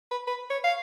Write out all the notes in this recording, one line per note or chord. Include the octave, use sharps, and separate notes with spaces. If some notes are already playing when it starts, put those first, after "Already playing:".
B4
B4
C#5
F5